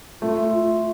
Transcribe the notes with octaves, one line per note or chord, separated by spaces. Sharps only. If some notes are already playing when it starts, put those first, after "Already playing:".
A3 F4
F4